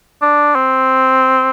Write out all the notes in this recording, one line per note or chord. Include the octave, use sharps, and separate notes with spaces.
D4
C4